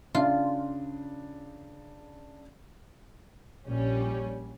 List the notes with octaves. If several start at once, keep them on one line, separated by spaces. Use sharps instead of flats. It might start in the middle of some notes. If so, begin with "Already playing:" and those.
C#3 D4 F4
A#1 G3 C#4